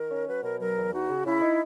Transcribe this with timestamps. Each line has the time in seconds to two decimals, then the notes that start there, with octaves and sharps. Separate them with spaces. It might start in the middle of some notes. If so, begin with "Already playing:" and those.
Already playing: D#3 A#4
0.10 C#4
0.27 F#3 B4
0.43 B2 A#4
0.59 F#3 A#4
0.76 E2
0.92 D#4 F#4
1.09 C#3
1.25 C#3 E4
1.42 D#4